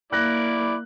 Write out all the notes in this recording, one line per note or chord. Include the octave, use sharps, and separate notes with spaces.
A#3 E4 D5 F#6 A#6